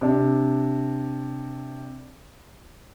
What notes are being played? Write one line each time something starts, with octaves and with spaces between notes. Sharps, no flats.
C3 D4